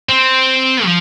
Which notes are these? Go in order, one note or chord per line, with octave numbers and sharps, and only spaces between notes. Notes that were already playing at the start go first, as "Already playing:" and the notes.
C4
F3